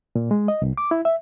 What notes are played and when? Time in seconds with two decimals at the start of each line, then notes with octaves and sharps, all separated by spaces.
0.15 A#2
0.31 G#3
0.48 D#5
0.62 C2
0.78 D6
0.91 E4
1.05 E5